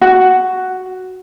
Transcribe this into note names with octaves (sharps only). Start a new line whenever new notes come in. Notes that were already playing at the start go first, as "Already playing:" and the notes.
F#4